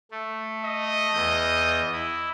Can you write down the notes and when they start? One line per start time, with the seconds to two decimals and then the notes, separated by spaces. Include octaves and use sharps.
0.11 A3
0.64 D#5
1.14 E2 G6
1.92 E4